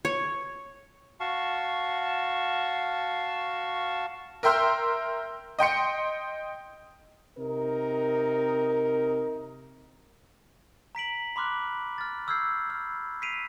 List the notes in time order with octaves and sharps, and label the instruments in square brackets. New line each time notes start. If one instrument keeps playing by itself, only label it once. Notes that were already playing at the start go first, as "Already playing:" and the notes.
[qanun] C#5
[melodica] F#4 F5 A5 C#6
[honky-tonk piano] A#4 E5 G5 C6 E6 F6
D#5 G5 C6 C#7
[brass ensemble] C3 D#4 A#4
[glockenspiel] A#5 B6 D7 F#7
B5 C6 D6 F6 F#6
F6 A6
C#6 E6 F6 G6 G#6 C7
B5 E6 F6
B6 C7 D7 D#7 F7